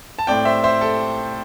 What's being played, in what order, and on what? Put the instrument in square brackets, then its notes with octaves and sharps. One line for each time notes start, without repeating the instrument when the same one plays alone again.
[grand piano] A5
A2 A3 C4 D5 G5
C5 E5
C5 E5
A4